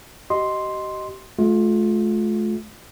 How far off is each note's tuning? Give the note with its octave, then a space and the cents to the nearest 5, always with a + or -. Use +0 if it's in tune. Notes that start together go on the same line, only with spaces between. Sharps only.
G4 -40 D#5 +0 C6 +0
A3 -40 F4 +20